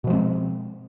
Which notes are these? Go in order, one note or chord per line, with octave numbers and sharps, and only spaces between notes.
B2 F3 G#3 C4